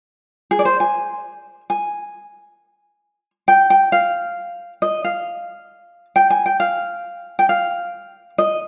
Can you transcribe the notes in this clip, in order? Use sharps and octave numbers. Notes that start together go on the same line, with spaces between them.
G#4
D5
C5
G#5
G#5
G5
G5
F5
D#5
F5
G5
G#5
G5
F5
G5
F5
D#5